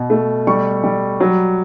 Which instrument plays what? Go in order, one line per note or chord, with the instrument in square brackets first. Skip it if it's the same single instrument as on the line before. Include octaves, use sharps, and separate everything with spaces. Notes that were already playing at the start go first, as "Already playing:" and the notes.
Already playing: [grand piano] B2
A3
G3 C#6
G3
F#3